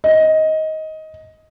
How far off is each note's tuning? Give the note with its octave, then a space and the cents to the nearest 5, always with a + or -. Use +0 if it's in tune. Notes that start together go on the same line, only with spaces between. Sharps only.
D#5 +15